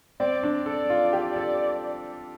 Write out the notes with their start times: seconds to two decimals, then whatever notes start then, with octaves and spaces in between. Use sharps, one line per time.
0.20 C4 D5
0.43 D4
0.66 A4
0.90 F4
1.13 G4
1.36 A4